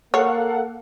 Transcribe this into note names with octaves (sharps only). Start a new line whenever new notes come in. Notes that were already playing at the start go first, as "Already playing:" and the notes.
A#3 A4 C#5 F5 F#5